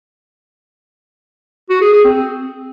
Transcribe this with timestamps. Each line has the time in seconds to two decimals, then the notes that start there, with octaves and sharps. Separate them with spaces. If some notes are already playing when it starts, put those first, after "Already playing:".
1.70 F#4
1.81 G#4
1.93 G#4
2.04 C4